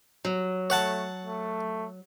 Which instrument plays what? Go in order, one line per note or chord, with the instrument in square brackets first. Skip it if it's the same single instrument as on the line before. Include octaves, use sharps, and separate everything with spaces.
[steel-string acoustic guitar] F#3
[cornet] A3 [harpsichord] C#5 F#5 A5
[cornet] A3